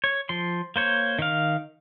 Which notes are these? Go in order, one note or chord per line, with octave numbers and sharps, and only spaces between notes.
C#5
F3 C6
A#3 C5 C#5
D#3 F5